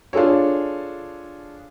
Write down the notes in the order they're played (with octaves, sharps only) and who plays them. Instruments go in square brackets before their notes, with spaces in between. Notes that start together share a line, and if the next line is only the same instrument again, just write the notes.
[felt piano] D4 F4 G#4 A4 C#5